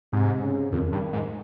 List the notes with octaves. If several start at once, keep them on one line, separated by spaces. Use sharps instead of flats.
G#2 C3
C#3
F2 D#3
G2
G#2